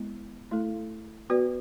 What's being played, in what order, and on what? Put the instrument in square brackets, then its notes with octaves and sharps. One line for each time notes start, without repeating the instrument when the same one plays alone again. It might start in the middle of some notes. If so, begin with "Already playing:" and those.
Already playing: [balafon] G#3 B3 E4
A3 E4 A4
B3 F#4 B4 D5